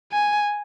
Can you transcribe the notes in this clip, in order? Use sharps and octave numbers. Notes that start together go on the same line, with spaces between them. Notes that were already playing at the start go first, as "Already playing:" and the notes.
G#5